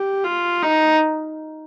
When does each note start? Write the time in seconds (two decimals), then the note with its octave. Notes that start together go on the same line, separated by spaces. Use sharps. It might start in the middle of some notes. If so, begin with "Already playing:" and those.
Already playing: G4
0.24 F4
0.63 D#4